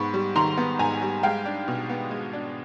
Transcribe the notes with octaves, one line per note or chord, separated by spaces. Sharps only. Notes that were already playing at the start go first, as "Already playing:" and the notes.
Already playing: G#2 B3 B5 C#6
G3
D#3 A#5 C6
B3
G#2 G#5 A#5
G3
G#3 F5 G5
D4
B2
B3
G#3
D4